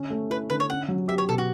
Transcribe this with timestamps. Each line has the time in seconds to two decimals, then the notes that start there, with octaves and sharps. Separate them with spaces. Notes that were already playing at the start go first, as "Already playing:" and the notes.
Already playing: D3 C#4
0.10 A3
0.30 E4 B4
0.50 D3 B4
0.60 C#5
0.69 C#4 F#5
0.88 F#3
1.08 G4 E5
1.18 C#5
1.28 B2 A4
1.38 F#4